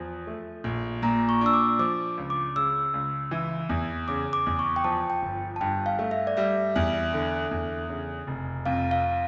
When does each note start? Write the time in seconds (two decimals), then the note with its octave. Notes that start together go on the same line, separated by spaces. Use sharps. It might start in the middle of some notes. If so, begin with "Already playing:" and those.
Already playing: E2 F3
0.27 A3
0.64 A#1
1.02 A#2 A#5
1.29 C#6
1.41 D4 E6
1.53 D6
1.79 F3 D6
2.18 C#2
2.30 D6
2.56 C#3 E6
2.94 C#2
3.31 E3
3.69 E2
4.08 C#3 D6
4.33 D6
4.46 E2
4.59 C#6
4.76 G5
4.84 F3 A5
5.10 G5
5.22 G1
5.56 A5
5.61 G2 G5
5.86 F5
5.99 A3
6.11 E5
6.27 D5
6.37 G3 E5
6.76 E2
7.13 D3
7.51 E2
7.90 C#3
8.27 F1
8.66 F2 F5
8.91 F5